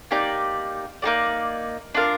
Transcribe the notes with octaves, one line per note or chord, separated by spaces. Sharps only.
A#3 D#4 G4 D5
A#3 D#4 G4 D5
D4 F4 A#4